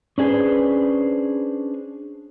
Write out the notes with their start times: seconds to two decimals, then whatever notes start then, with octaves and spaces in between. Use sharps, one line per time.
0.18 C#4 D4 G#4 B4 C5